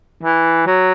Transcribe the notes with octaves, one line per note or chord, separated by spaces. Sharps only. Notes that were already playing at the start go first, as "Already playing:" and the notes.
E3
F#3